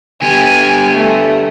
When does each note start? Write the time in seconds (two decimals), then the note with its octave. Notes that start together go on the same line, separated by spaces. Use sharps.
0.22 D3 B3 G4 G#5
0.95 A3